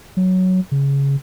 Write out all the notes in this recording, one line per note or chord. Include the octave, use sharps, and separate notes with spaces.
F#3
C#3